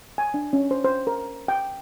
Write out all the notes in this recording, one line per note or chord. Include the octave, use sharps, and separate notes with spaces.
G#5
D4
C#4
C5
C5
A#4
G5